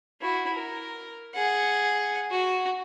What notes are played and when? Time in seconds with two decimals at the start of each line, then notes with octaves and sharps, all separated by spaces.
0.21 E4 F#4
0.53 A#4
1.34 G#4 F#5
2.31 F#4